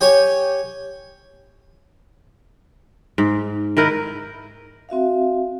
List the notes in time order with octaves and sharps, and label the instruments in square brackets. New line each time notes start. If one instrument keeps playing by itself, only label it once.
[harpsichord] G4 C#5 G#5
[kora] G#2
D#3 E4 A#4 B4
[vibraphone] C4 F#4 E5 F5